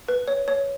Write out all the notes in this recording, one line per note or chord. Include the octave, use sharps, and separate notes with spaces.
B4
C#5
C#5